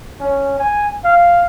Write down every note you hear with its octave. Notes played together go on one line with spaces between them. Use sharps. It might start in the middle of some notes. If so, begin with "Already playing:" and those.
C#4
G#5
F5